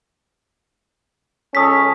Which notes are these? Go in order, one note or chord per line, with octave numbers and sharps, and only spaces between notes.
C#2 C#4 A4 D#6 B6